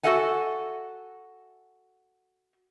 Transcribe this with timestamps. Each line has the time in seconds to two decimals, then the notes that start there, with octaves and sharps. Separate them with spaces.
0.03 F#4 G4 A4 E5 F#5 G#5